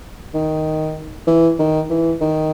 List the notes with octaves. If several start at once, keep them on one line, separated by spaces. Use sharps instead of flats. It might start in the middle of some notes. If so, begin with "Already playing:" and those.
D#3
E3
D#3
E3
D#3